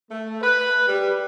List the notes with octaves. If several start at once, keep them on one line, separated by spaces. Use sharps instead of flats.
A3
B4
G3